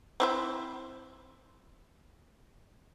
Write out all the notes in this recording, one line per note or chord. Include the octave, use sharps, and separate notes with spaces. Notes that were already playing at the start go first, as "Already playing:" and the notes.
C4 E4 C5